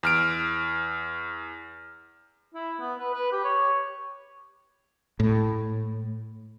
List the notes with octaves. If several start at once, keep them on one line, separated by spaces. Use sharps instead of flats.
E2 F6 D7
E4
B3
B4
B4
G4
C#5
A2